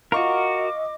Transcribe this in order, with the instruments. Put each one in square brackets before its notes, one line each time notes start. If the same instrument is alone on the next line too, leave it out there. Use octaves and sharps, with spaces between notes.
[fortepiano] F4 C#6 [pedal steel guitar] F#4 A#4 [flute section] D#5 D6